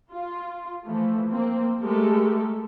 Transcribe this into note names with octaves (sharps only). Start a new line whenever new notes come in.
F4
E3 F3 A3
A#3 C4
G#3 A3 G4 A4 A#4